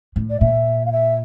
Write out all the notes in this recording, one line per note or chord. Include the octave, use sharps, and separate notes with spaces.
A2
D5
A#2 E5
F5
E5